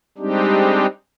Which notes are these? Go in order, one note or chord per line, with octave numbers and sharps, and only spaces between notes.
G3 G#3 C4 D4 D#4 G4